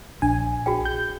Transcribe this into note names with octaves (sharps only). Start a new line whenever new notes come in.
A#1 D4 G#5
F#4 G#4 G5
G6